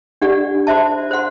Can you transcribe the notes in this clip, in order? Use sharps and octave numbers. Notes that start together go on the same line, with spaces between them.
D4 G4 D5 F#5
F#4 C5 E5 A5
C5 F#5 C6